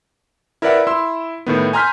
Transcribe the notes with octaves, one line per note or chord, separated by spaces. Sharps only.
E4 A#4 B4 D5 E5 F#5
E4 C6 E6
A2 D#3 B3
G#5 A#5 C6 F6 G6 B6